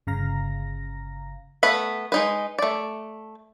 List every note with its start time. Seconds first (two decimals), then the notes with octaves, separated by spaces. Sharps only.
0.07 G1 C#3 F5 A#5 A#6
1.63 A3 B3 B4 B5
2.12 G#3 D#4 B4
2.58 A3 D5